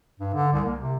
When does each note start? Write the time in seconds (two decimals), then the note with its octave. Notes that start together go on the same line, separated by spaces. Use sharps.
0.20 G2
0.34 D3
0.53 C2
0.65 A#3
0.80 C3